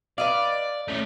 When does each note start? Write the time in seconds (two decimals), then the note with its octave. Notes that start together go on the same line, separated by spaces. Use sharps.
0.18 B4 D5 D#5 F5
0.88 A3 C#4